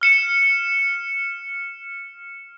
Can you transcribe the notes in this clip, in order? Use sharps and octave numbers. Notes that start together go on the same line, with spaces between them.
F6 C#7 E7